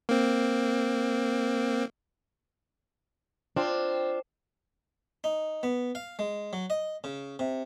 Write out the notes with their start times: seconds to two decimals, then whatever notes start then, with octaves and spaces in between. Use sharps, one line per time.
0.09 A#3 C4
3.56 C4 D4 F4
5.24 D#4
5.63 B3
5.95 F5
6.19 G#3
6.53 F#3
6.70 D#5
7.04 C#3
7.39 C3